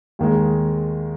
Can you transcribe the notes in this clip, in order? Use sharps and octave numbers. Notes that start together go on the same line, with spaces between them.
D#2 D#3 G#3